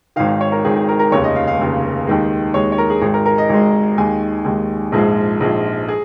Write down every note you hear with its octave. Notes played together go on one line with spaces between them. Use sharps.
G#1 G#2 D#3 F5
F5
C#5
A#4
G#1 G#2 D#3 G#4
G#4
A#4
A#4
F1 D#2 C#3 C#5
D#5
F5
F5
F1 D#2 C#3
D#2 D#3 G#3
D#2 D#3 G#3 C#5
C#5
A#4
G#4
G#1 G#2 G#3
A#4
A#4
D#5
G#1 G#2 G#3
D#2 D#3 G#3 G#5
D#2 D#3 G#3
A#1 G#2 F3 G#3 G#4
A#1 G#2 F3 G#3
G#4